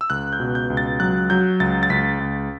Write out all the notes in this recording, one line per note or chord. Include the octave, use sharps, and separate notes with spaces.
E6
C#2 F#6
G6
B2
G6
C#2
A6
F#3 F#6
F#3 G6
C#2 A6
A6
C#2 B6
C#2